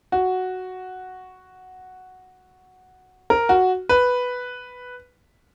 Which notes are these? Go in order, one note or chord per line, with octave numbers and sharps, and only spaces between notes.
F#4
A#4
F#4
B4